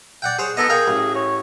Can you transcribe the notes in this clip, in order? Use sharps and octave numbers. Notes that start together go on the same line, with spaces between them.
D5 F#5 G5
G#4 C5 C#5
B3 D#4 A4 D#5
G#4 A#4 F5 G5
A1
C#5